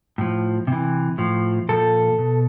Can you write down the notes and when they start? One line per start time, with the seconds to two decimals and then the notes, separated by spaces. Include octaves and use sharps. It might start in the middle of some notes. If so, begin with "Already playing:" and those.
0.18 A2 F3
0.67 C3 E3
1.18 A2 F3
1.69 A#2 F3 A4
2.18 B2